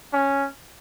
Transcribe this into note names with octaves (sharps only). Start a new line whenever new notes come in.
C#4